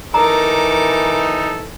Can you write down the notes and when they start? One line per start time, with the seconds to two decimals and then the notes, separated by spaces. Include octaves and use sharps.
0.14 E3 D#4 A4 A#4 A#5 D6